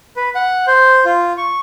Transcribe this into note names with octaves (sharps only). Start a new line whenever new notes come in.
B4
F#5
C5
F4
C#6